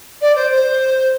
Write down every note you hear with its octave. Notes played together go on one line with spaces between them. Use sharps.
D5
C5
C5